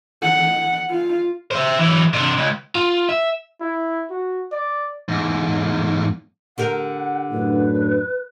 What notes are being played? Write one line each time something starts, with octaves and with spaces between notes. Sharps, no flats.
F#5
F4
C5 E5
E3 F#3
C3 D4
C#2
F4
E5
E4
F#4
D5
E2 G#2
D3 G4 A#4 F#5
F#2 A2 D4 B4